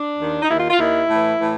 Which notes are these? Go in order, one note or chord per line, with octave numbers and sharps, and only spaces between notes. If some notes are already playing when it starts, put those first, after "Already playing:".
Already playing: D4
D#2 D#3
D#4
D#2 D#3 E4
F4
F4
D#2 D#3 E4
A2 E3
A2 E3